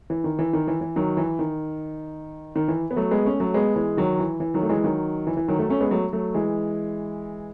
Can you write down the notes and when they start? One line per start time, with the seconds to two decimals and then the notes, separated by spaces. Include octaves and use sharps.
0.10 E3
0.24 D#3
0.39 E3
0.53 D#3
0.68 E3
0.81 E3
0.96 D#3 F#3
1.17 E3
1.39 D#3
2.56 D#3
2.68 E3
2.91 B3
2.96 F#3 A3
3.11 G#3 B3
3.25 A3 C#4
3.40 F#3 A3
3.54 G#3 B3
3.76 E3 G#3
3.97 D#3 F#3
4.19 E3
4.40 E3
4.54 D#3 F#3
4.63 A3
4.69 E3 G#3
4.84 D#3 F#3
5.27 E3
5.37 E3
5.48 D#3 F#3
5.59 F#3 A3
5.69 A3 C#4
5.81 G#3 B3
5.91 F#3 A3
6.13 F#3 A3
6.34 E3 G#3